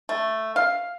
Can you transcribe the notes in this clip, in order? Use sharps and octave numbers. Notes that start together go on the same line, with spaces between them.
A3
F5